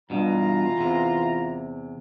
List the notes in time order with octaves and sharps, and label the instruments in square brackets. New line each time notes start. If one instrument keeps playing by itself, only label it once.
[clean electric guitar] G2 B2 [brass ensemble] E3 F4 A#5
[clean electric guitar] E2 C3